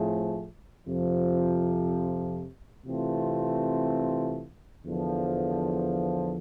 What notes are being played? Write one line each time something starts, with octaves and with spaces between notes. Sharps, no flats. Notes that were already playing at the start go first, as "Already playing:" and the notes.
Already playing: A2 F3 A3 C4 G#4
F2 C3 F3
C3 E3 A3 C4 F4
E2 D3 F3